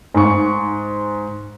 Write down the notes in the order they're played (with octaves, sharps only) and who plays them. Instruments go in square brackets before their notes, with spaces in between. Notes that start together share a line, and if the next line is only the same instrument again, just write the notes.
[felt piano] G#2 C#6